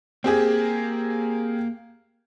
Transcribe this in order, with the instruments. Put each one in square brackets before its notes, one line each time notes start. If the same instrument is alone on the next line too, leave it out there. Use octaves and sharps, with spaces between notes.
[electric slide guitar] A#3 [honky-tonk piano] C4 G4 G#4